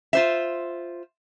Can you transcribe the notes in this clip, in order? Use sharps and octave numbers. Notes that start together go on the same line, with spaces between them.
F4 C5 E5